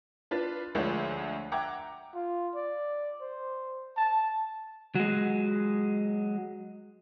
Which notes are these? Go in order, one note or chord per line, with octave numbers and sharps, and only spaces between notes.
D4 F4 B4 A6
D2 F3 G#3 D4 C#5 F#5
E5 F#5 G5 A#5 D6 G#6
F4
D5
C5
A5
F#3 G#3